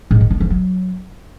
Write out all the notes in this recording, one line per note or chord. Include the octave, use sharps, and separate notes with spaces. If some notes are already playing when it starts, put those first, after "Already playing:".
G#2
D#3
B3
E3
F#3